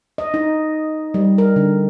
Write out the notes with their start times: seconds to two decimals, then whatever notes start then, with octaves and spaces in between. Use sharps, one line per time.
0.18 D#5
0.34 D#4
1.14 G3
1.38 A#4
1.56 D3